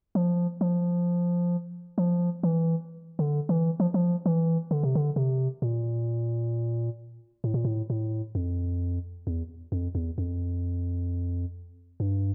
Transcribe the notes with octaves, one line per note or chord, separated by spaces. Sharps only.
F3
F3
F3
E3
D3
E3
F3
F3
E3
D3
C3
D3
C3
A#2
A2
A#2
A2
A2
F2
E2
F2
E2
F2
G2